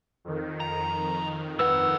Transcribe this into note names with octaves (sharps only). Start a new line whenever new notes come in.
F2 D#3
A#5
G2 B4 F#5 E6